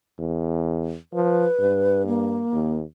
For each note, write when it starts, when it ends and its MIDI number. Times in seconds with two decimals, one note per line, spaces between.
0.18 0.95 40
1.13 1.45 53
1.13 2.06 71
1.59 2.43 43
2.07 2.77 58
2.52 2.83 39